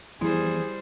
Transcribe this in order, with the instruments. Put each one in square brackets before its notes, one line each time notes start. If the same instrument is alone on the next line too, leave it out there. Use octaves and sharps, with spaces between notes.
[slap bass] E3 F3 B3 [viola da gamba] G3 C5 [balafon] E4 [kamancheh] G#4